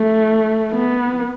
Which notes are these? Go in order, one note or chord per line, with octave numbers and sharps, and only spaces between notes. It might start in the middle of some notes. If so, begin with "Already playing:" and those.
Already playing: A3
B3